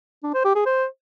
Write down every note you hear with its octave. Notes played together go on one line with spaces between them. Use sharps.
D4
C5
G4
G#4
C5